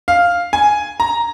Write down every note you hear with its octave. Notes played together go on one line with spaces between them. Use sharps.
F5
G#5
A#5